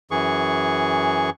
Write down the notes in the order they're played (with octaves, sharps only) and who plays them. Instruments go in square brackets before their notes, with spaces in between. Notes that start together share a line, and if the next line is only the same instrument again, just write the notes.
[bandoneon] F#2 E3 G#4 C#6